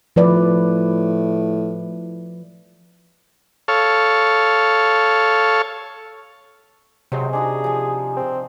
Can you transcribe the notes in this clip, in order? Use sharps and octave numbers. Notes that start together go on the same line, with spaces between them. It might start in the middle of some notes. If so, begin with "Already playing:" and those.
A2 F3 B4 D5
A4 C#5 F5
C3 F#3 G#3 C5
D4 D#4 F#4 G#4
F3 G#5
C4